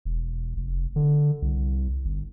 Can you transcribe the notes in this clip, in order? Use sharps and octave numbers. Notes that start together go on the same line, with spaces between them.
E1
F1
D3
C2
G1